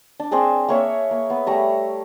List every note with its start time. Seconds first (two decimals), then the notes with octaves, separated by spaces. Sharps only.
0.20 D4
0.31 C4 D4 G#4 A#4
0.69 A#3 C#5 E5
1.11 A#3
1.30 B3
1.47 G3 A3 A#5